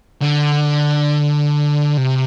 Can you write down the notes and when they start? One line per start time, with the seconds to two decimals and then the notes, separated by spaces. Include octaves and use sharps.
0.21 D3
1.97 C3